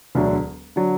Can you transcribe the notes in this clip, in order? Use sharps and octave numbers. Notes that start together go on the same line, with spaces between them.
E1 D2 D3 F#3
D3 F#3